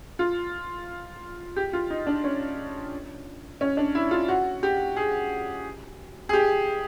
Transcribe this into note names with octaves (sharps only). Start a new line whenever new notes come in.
F4
G4
F4
D#4
D4
C#4
C#4
D4
E4
F4
F#4
G4
G#4
G#4
G4